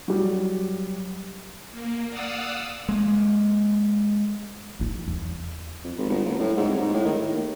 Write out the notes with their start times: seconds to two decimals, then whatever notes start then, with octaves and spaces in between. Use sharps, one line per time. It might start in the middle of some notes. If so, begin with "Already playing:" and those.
0.08 F#3 G3
1.71 A#3
2.10 D5 F5 F#5 D#6 E6
2.89 G#3 A#3
4.79 D#4 F4
5.08 E2
5.84 F2
5.98 G#1
6.09 G1
6.25 F#1
6.40 A2
6.57 G#2
6.68 C2
6.80 G#2
6.94 A2
7.05 D#3
7.19 A2
7.33 D#2